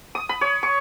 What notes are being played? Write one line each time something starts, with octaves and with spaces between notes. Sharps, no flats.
D#6
B5
C#5
C#6